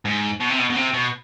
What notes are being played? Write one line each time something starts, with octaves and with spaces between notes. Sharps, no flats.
G#2
B2
C3
B2
B2
C3
B2